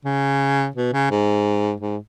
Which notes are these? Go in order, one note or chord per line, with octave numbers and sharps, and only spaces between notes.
C#3
B2
C#3
G#2
G#2